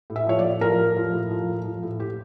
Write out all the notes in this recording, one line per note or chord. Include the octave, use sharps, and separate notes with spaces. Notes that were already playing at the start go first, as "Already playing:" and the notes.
A2
E5
F3 C#5
D5
A2
F3 A#4
A2
F3
A2
F3
A2
F3
A2
G4